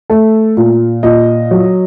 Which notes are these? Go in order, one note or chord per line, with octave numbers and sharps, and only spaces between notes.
A3 A4
A#2
A#2 D#5
F#3